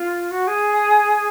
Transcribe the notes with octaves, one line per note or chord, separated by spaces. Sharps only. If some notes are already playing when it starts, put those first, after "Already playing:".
Already playing: F4
F#4
G#4